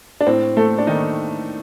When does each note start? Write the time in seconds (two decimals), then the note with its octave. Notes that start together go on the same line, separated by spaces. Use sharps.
0.21 D4
0.27 A2 C4
0.57 A3 A4
0.78 D4
0.87 D#3 D#4